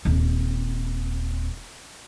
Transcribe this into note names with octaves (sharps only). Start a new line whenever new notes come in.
D#1 C4